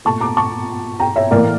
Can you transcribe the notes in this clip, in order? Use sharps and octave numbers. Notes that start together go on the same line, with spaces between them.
A#2 A3 A5 C#6
A#5 D6
A5 C#6
G5 A#5
C#5 E5
A2 E3 A#3 A#4 D5